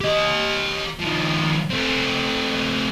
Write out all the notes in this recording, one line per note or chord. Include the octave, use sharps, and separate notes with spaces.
G4 D#5
D#3 F3
A3 C4